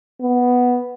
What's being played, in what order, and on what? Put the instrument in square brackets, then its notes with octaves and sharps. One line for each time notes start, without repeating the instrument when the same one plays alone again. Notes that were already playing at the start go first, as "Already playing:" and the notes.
[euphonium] B3